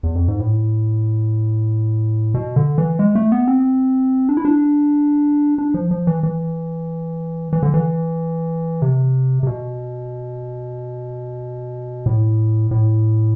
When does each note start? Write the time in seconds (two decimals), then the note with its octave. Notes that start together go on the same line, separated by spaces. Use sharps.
0.03 E2
0.15 F2
0.28 G#2
0.40 A2
2.34 B2
2.56 D3
2.78 E3
2.99 G#3
3.15 A3
3.32 B3
3.48 C4
4.29 D4
4.37 E4
4.45 D4
5.58 D4
5.74 F3
5.91 F3
6.07 E3
6.23 E3
7.53 E3
7.63 D3
7.74 E3
8.82 C3
9.43 C3
9.47 B2
12.06 A2
12.71 A2